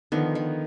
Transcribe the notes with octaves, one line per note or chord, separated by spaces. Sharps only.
D3 D#3 F3 B3 F4
D#3